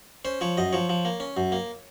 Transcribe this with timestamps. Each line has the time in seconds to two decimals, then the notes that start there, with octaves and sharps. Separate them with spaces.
0.25 C#4 C5
0.41 F3 C#5
0.57 F#2 D#5
0.73 F3 C#5
0.89 F3
1.05 A#3
1.20 C#4
1.37 F#2
1.52 A#3